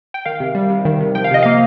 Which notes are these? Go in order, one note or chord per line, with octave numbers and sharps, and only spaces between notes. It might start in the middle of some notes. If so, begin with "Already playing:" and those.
G5
D#3 F5
C3
G3
C3
D#3
C3
F3 G5
F5
C3 D#5
A#3 F5